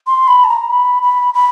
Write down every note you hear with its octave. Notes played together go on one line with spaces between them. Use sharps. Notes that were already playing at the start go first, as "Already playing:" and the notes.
C6
B5
A5
A#5
B5
B5
B5